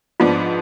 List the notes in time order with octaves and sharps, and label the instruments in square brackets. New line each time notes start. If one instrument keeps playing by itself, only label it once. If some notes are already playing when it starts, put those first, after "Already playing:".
[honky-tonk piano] G#2 F3 B3 D4 [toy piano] F4